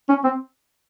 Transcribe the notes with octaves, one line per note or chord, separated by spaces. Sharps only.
C#4
C4